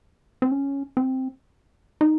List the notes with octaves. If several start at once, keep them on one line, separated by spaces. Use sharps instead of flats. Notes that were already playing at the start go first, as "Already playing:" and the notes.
C4
C#4
C4
D#4